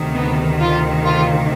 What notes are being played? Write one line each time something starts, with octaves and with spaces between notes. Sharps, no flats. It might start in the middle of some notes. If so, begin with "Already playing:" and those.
Already playing: D2 C3 D#3
B3
F4
F4